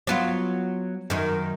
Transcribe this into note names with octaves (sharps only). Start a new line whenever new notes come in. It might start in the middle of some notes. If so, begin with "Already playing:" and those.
F#3 B3 F4
F#2 D#3